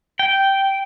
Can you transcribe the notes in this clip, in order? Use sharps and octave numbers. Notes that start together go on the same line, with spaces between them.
G5